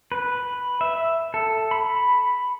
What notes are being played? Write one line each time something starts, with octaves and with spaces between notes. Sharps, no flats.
B4
E5
A4
B5